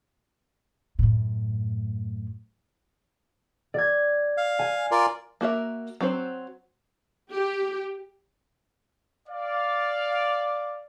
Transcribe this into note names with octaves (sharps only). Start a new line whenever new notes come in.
F#2 A2
D5 G#6
F5
G#5
F4 A#4 D5
A#3 F#4 A#4 E5
F#3 C4 F#4 C5
G4
D5 F5